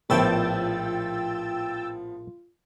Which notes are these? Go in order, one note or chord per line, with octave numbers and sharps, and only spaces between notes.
A#1 A2 F3 B3 F4 G5 E6 A6